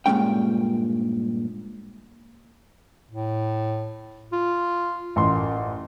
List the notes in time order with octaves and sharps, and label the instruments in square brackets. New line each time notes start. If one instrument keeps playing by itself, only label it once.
[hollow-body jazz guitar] G2 A#2 C#3 G#3 C#4 G5
[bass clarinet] A2
F4
[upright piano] A1 C6 [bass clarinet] F#2